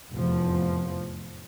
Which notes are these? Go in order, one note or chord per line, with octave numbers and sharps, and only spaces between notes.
F1 E2 A2 F3